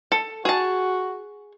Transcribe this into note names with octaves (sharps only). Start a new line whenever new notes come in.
A4
F#4 G#4 A5